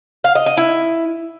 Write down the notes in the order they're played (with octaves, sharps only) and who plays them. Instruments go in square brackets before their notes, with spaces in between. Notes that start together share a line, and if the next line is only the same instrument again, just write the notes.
[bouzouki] F5
D#5
D#5
E4